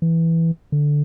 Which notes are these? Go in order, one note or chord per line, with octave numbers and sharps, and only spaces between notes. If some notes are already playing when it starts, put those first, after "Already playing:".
E3
D3